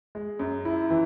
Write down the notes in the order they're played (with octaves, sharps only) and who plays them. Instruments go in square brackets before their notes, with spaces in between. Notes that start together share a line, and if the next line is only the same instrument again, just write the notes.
[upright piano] G#3
F#2
E4
E3